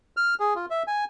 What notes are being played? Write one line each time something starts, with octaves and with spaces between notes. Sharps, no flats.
F6
G#4
F4
E5
G#5